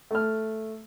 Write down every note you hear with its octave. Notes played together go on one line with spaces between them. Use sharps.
A3 F6